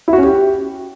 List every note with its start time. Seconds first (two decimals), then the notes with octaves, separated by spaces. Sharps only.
0.08 E4
0.13 F#4
0.18 C#4
0.23 G4